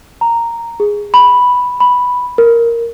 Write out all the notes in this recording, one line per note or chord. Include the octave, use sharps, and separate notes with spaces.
A#5
G#4
B5
B5
A#4